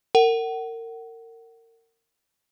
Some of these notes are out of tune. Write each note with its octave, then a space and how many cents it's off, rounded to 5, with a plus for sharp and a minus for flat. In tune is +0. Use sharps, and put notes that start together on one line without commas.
A#4 -30 F#5 +30